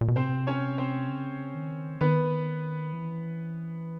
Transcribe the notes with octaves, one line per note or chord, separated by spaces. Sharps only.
A#2
B2
C3 C4 C5
C#4 C#5
C4 C5
C#3
D#3
D#3 B3 B4
E3